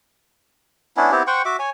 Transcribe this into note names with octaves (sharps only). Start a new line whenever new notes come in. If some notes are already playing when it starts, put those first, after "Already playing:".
B3 C#4 D4 E4
B3 C4 E4 G4
C5 F#5 G5 C#6
F#4 E5 D6
C#5 G#5